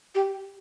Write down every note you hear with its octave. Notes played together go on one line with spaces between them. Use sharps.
G4